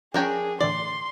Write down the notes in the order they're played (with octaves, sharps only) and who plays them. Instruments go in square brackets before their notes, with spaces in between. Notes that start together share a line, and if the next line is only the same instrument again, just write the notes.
[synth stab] F3 C#4 [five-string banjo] D4 A#4 G5 [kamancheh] G#4
[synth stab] A2 D3 E3 [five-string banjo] D5 [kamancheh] C6